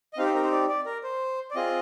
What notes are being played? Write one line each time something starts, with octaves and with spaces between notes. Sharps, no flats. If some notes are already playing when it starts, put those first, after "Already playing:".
D#5
C4 D#4 G4 F5
C5
A#4
C5
D5
D5
A#4
C5
D5
C4 F4 G#4 D#5